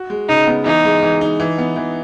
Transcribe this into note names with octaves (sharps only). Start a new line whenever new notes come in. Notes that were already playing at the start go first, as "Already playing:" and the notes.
Already playing: F#4
G#3
C#3 D#4
B3
E3 D#4
G#3
E3
D#4
E3
B3
E3